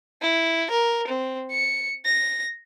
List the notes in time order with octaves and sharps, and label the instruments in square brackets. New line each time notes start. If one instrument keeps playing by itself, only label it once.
[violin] E4
A#4
C4
C#7
A#6